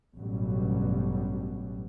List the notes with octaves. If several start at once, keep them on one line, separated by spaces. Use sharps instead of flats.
A1 G2 B2 F#3 G3